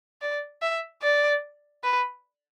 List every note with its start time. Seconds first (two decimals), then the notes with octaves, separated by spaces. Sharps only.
0.22 D5
0.62 E5
1.03 D5
1.84 B4